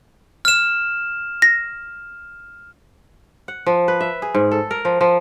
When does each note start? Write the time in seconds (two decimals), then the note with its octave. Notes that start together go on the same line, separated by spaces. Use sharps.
0.45 F6 E7
1.42 A#6
3.48 F#5
3.66 F3
3.88 B4
4.01 E5
4.22 G#4
4.34 G#2
4.52 A4
4.71 A#4
4.85 F3
5.01 F3